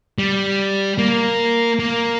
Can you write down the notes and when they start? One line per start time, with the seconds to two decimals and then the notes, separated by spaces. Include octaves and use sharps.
0.18 G3
0.98 A#3
1.80 A#3